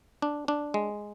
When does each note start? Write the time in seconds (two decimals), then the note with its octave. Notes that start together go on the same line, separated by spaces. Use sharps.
0.22 D4
0.48 D4
0.74 G#3